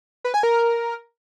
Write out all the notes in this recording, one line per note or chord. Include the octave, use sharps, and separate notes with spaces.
B4
G#5
A#4